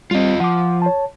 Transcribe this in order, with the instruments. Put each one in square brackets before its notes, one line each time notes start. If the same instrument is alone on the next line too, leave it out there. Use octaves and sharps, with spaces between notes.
[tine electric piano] G3 C4 [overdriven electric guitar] F4 D#5
[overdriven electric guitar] F3 [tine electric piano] F#5 D6
[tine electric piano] C#5 A5